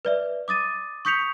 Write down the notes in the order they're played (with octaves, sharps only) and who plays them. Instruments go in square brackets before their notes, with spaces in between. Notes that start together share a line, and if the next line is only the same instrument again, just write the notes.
[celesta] B4 D5 E5
D6 D#6 A6 D#7
C#6 D#6 G6 B6 C#7 F7